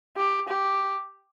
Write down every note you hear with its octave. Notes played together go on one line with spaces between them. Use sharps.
G4
G4